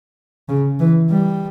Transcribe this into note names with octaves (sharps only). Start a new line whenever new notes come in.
C#3
E3
G3